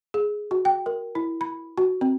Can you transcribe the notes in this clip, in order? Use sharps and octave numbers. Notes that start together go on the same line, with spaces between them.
G#4
F#4
G5
A#4
E4
B5
F#4
C4